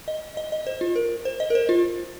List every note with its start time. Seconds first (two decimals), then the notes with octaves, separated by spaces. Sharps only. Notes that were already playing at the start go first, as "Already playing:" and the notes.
0.08 D#5
0.37 D#5
0.52 D#5
0.67 C5
0.81 F4
0.96 A#4
1.25 C5
1.40 D#5
1.50 A#4
1.55 C5
1.69 F4